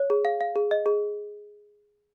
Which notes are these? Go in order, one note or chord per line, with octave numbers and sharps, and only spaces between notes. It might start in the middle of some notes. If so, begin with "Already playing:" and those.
Already playing: C#5
G#4
F5
F5
G#4
D#5
G#4